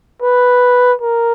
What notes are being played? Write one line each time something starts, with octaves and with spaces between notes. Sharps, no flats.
B4
A#4